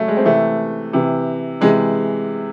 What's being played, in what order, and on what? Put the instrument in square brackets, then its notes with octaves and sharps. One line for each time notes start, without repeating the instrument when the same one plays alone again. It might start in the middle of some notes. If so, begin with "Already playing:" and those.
Already playing: [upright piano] C#3 F#3 A3 C#4
G#3
C4
C3 E3 A3
C3 E3
C3 E3 G#3